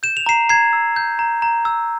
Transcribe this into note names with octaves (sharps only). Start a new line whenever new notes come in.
G6 E7
F7
A#5 C7 E7
A#5 G#6 C7
E6
G6
A#5
A#5
E6